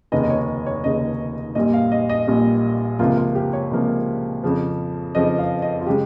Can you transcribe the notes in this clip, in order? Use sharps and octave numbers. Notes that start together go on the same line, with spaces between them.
F1 D#2 C#3 D#5
D#5
C#5
C#5
F1 D#2 C#3 D#5
A#1 A#2 G3 D#5
F5
D#5
D#5
A#1 A#2 G3
C#2 C3 F3 A#3 F4
F4
G4
C#5
C#2 C3 F3 A#3
F2 C#3 F3
F2 C#3 F3 D#5
F5
D#5
F4
C#3 G#3 G4